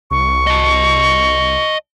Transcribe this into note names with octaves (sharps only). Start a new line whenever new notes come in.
C2 C#6
D#5 A5